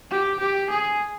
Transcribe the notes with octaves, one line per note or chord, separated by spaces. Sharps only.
G4
G4
G#4